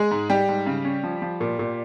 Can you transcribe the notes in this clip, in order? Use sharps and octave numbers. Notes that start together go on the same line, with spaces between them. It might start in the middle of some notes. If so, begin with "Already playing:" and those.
Already playing: G#3 G#4
G#2
G3 G4
G#2
C#3
C#4
F3
F3
A#2
A#2